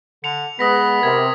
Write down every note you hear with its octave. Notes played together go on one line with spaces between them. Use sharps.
D3 C#7 F7
G#3 B3 B4 D#6 A#6 B6
C3 A#4 G#6